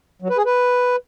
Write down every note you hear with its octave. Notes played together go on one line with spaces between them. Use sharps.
F#3
B4
G#4
B4